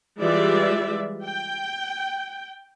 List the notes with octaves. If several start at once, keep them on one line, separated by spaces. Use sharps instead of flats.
E3 G3 G#3 F4 D5 E5
G5